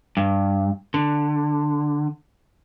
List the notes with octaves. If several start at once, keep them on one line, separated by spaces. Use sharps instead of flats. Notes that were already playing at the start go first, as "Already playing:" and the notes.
G2
D3